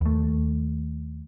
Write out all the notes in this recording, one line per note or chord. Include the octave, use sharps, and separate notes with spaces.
D#2 A3